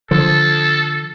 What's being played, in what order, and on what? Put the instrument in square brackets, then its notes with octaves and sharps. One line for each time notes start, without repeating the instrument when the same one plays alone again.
[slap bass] D3 F3 [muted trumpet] A4